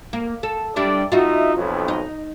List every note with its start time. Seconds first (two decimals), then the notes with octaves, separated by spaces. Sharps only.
0.13 A#3
0.43 A4
0.76 G3 D4 E4 D5
1.12 D#4 F4 F#4 D#5 E5
1.55 B1 F2
1.88 D#4